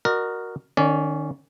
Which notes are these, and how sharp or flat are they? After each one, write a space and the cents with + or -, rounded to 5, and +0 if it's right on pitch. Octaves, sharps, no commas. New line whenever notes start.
F#4 +0 A#4 +0 D#5 -45
D#3 -35 C#4 +0 D5 -30